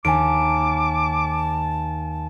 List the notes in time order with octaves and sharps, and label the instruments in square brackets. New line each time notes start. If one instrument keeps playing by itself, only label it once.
[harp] D#2 [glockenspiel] G#5 D7 [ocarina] A5 [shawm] D6